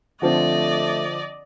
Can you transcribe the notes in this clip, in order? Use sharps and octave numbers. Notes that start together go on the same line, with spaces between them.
D3 F3 A3 C4 D5 D#5